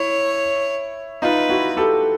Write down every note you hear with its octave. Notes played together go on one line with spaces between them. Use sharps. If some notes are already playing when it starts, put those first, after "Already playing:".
Already playing: E4 C#5
D#4 F4 B4
E4 F#4
G4 A4